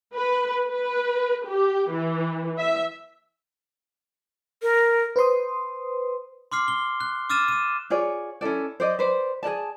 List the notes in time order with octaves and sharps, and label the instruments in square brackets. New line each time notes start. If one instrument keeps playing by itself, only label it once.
[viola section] B4
B4
G4
E3
E5
[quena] A#4
[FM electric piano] B4 C5 C6 D#6
[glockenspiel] C6 D6 F6 C7
G7
F#6
D6 E6 F6 A6 D#7 E7
D#7 E7
[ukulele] F4 G#4 C#5 D5
C#4 E4 A4 D5
C5 D5 D#5
B4 C5 D5
G#4 A#4 D5 A5